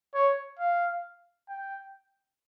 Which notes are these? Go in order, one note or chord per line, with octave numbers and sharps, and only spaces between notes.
C#5
F5
G5